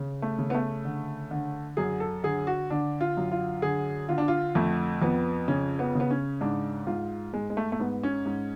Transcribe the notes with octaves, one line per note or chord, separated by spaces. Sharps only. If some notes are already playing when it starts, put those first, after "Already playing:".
Already playing: C#3
A3
C#3
B3
A3
D3
D3
F#2 G#4
A4
D3 G#4
F#4
D3 D4
F4
F#2
F4
D3 G#4
D3 F4
D4
F4
F2 A3
F2 B3
C#3 C#4
B3
C#3 B3
C#4
G#2 D4
G#2 F4
G#2 G#3
G#3
A3
A3
G#2 B3
C#4
G#2